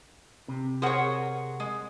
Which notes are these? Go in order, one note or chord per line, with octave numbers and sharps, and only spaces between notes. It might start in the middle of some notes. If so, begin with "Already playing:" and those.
C3
G#4 A#4 C5 C#5 F#5
G#3